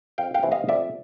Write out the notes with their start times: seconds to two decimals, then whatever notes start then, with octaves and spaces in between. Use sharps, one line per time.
0.18 F2 F5 G5
0.34 F5 G5
0.43 C3 E3
0.52 D#5 F5
0.68 F2 D5 E5